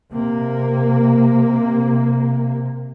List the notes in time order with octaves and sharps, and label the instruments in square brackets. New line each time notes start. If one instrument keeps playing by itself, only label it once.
[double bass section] C3 A#3